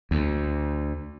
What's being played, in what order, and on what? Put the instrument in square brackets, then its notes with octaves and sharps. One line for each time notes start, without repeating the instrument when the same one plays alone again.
[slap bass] D2